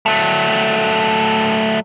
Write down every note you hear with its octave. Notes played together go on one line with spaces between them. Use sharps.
F#3 A3